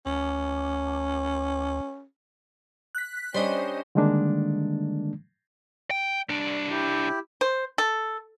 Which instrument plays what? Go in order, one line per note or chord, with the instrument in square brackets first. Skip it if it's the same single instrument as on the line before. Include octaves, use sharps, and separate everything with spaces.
[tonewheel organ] D2 [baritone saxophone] C#4
[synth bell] F#6 B6
[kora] G3 D4 [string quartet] C#4 [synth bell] C5 D#5
[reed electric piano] D3 D#3 G3 G#3 A#3 D4
[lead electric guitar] G5
[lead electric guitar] C2 D4 [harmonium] G3
[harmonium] E4 G4
[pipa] C5
A4